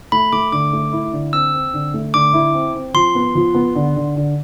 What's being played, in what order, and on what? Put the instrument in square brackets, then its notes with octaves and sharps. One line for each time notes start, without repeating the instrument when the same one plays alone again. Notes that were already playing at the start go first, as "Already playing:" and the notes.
[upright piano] A3 [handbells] B5
[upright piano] A3 [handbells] D6
[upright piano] D3 [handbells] D6
[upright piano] A3
E4
D3
[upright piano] C4 [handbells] E6
[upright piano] C4
D3
A3
[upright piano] D3 [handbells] D6
[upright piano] E4
C4
C4
[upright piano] F3 [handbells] C6
[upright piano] B3
F3
B3
D3
D3
D3